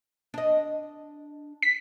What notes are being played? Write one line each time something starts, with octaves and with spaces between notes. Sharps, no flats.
D4 D#5
B6